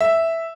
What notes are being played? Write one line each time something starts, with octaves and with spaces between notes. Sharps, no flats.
E5